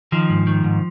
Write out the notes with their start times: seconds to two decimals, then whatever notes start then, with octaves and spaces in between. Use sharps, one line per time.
0.12 D#3 F3
0.30 G#2
0.47 D#3
0.64 G#2